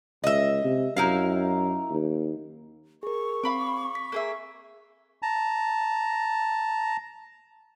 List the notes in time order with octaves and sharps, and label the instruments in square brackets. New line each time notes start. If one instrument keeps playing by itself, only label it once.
[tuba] C#2 [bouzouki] D#5 E5
[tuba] C3
[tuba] F#2 [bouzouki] D#4 E4 F5
[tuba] D#2
[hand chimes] G#4 A#4 [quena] C#6
[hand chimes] C4 [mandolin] F5 B5 D6
[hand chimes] B6
[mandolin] A#3 G#4 E5
[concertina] A5 A#5